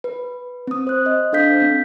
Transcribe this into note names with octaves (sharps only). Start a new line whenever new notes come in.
B4
C4 D#6
C5 F#6
C5 D#5
D4 A4 F5 G6 B6
C4 B6